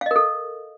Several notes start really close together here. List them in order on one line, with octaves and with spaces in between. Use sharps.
F5 D#5 A#4 A4